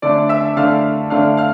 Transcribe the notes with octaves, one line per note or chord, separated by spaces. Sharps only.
D3 A3 D4 D5 D6
E5 E6
D3 A3 D4 F5 F6
D3 A3 D4 F5 F6
F5 F6